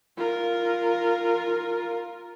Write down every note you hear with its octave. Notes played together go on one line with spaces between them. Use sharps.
F4 A#4